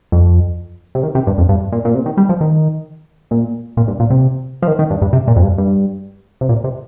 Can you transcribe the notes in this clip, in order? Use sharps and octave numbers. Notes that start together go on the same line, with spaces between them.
F2
C3
D#3
C3
G2
F2
G2
A#2
A#2
C3
D#3
G3
F3
D#3
A#2
A#2
G2
A#2
C3
F3
D#3
D#3
G2
G2
C3
A#2
F2
G2
G2
C3
A#2
C3